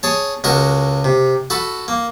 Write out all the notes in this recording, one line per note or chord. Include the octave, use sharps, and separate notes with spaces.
G#4 C#5 A5
C#2 G#3 F#4 A#4 F#5
C3
F#4 A4 B5
A#3